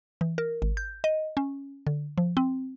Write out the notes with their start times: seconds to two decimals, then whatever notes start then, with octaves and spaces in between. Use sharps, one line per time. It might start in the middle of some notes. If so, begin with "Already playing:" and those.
0.21 E3
0.38 A#4
0.62 G#1
0.77 G6
1.04 D#5
1.37 C#4
1.87 D3
2.18 F3
2.37 C4